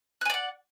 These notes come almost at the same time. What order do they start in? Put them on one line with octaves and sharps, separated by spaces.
F#6 G#5 D5 F#5